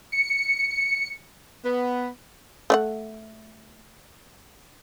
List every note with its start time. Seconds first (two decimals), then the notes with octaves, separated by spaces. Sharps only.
0.12 C#7
1.64 B3
2.70 A3 D5 F#5